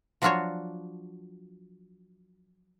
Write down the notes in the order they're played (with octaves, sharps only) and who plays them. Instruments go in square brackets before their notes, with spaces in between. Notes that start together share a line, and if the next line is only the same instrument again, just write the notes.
[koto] F3 F#3 D4 F4 F#4 C#5